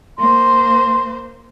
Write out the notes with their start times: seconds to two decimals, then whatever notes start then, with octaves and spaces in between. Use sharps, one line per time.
0.19 A#3 C5 C6